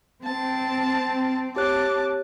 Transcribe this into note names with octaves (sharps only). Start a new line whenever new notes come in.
C4 A5
G4 C#5 A5 D6 F#6